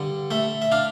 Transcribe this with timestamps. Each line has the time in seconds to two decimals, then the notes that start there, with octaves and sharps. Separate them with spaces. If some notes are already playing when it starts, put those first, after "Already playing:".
Already playing: G2 D3
0.31 A3 E5
0.62 E5
0.72 D4 F5